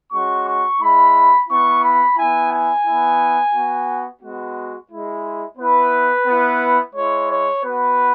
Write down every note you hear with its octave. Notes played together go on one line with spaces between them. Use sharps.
G#3 C#4 F#4 C#6
C#6
G#3 E4 B5
B3 E4 C#6
B5
B3 E4 G#5
G#5
B3 E4
B3 F#4
G#3 B3 F#4
G#3 E4
B3 E4 B4
B3 E4
G#3 E4 C#5
C#5
B3 F#4 B4